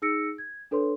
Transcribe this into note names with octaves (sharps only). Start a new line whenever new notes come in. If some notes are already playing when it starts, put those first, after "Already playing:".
D#4 G#4 E6 A#6 C#7 D7
G#6
D4 A4 B4 C#5 C6